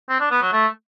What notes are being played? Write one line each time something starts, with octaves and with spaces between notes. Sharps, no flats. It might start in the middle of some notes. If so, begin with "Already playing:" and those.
C4
D4
B3
F#3
A3